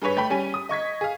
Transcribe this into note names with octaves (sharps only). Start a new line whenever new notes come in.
G2 G#4 B4 C#5 B6
A3 G5 B5
G3 C#4 G#5 D#7
D#6
D#5 C#6 G#6 B6
G#4 F5